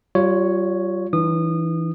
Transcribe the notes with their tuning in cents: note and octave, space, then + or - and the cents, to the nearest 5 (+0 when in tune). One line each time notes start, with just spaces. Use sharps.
G3 -30 F4 +0 C#5 +0
E3 +0 D#4 -45 D#6 -25